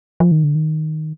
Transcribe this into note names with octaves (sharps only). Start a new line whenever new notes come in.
F3
D#3
D3
D#3